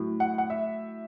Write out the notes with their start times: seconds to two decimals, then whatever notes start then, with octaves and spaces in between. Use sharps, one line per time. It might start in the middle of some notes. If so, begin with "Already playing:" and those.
Already playing: A2 F#3
0.20 F#5
0.38 F#5
0.50 E5